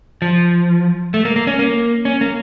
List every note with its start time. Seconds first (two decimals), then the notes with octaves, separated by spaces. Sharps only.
0.22 F3
1.14 A3
1.25 A#3
1.36 A#3
1.47 C#4
1.59 A#3
2.05 C#4
2.21 A#3